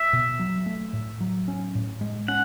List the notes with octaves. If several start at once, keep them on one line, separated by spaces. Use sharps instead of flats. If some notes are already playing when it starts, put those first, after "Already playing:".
Already playing: E5
B2
F#3
A3
A2
F#3
C#4
A2
G#3
C#4 F#5